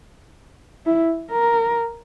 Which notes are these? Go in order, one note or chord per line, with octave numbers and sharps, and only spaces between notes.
E4
A#4